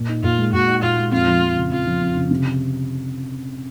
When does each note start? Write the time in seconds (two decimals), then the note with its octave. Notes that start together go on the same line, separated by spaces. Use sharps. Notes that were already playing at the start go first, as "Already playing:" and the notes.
Already playing: A#2
0.09 D#4
0.23 A#2 F4
0.38 G#3
0.53 A#2 F#4
0.67 D#4
0.82 A#2 F4
0.97 G#3
1.12 F2 F4
1.27 F3
1.42 F2
1.56 C#3
1.71 F2 F4
1.86 F3
2.01 F2
2.16 C#3
2.31 C3